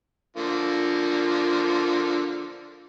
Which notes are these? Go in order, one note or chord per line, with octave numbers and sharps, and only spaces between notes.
D3 F3 A#3